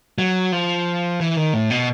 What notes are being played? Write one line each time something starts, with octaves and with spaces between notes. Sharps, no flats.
F#3
F3
E3
D#3
A2
B2